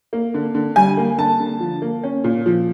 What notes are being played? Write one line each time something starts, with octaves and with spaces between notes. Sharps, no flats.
A#3
D3
D3
G3 G#5
A#3
D3 A5
D3
F3
A#3
C#4
A#2
F3